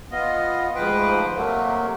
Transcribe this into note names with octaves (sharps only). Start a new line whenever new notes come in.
B3 F4 D#5
D2 G#2 F3 B4 C5 G5
C3 F#3 A3 A#3